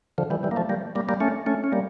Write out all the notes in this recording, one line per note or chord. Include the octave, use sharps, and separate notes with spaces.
D3 F3
E3 G3
E3 G3
A#3
F3 A3
G3 A#3
G3 A#3
G3 A#3
A3 C#4
A3 C#4
C#4
G3 A#3